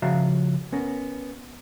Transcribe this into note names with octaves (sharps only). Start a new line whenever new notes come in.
C#3 F3 F#4 E5 F5 A#5
B3 C#4 A#4